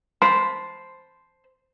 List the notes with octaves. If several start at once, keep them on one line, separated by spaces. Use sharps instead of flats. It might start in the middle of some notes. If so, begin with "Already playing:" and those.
C5 A5 B5 C6